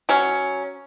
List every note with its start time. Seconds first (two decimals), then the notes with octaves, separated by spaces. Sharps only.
0.09 F#3 C#4